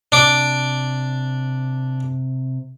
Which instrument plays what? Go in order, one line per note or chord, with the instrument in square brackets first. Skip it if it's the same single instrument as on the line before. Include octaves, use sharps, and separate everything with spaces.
[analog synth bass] C3 [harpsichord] D4 D6